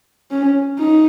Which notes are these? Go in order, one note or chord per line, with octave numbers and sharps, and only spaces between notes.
C#4
D#4